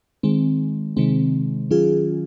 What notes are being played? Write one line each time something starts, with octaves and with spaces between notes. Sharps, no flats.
D#3 G#3 C4
C3 D#3 G#3 C4
D#3 F#3 C#4 F4 G#4